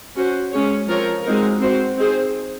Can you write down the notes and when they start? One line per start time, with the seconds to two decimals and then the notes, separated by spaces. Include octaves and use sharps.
0.16 C#4 F#4 C5
0.52 G#3 C#4 G#4 C#5
0.88 F3 C4 F4 A#4 C#5
1.24 G#3 C4 D#4 F#4 A#4
1.60 C4 F#4 C5
1.97 C4 D#4 G#4 C5